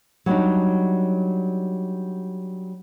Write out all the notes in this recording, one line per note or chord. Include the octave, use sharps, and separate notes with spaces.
F#3 G3 D4 D#4